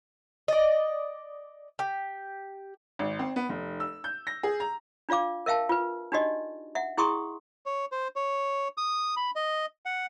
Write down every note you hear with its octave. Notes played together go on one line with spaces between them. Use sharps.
D5 D#5
G4
G#1
C4
B3
F1
E6
G6
A#6
G#4
A#5
D4 F4 D5 F5 D6
A#4 E5 F5 G5 A5
F4 B4
D4 D#4 F#4 G4 D5 D#5
E5 F#5
E4 G#4 G5 C6 C#6 D#6
C#5
C5
C#5
D#6
B5
D#5
F#5